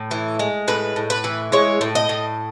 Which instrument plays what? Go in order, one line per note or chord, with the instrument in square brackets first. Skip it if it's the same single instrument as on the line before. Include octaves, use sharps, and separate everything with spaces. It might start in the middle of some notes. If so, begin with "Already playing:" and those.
Already playing: [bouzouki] A2
E3
G#3
A2 B4
A2
B4
E3
G#3 C#5
A2
D#5
A2